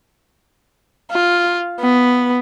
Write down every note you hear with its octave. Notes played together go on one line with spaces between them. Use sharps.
F4
B3